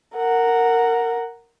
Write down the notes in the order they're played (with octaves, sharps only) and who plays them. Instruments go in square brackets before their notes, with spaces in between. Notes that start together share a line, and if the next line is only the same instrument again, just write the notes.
[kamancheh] A#4 F#5